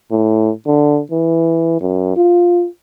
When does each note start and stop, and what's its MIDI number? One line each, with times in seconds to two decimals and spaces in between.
0.11 0.50 45
0.67 1.00 50
1.12 1.78 52
1.81 2.16 42
2.16 2.66 65